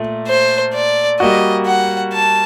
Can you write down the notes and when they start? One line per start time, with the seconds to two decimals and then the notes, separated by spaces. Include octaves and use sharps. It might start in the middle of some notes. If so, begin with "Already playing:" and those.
Already playing: A#2 A3
0.27 C5
0.74 D5
1.20 G3 A#3 F#4 D#5
1.66 F#5
2.13 A5